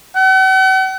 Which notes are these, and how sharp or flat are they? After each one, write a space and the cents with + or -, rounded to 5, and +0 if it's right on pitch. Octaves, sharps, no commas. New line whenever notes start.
F#5 +45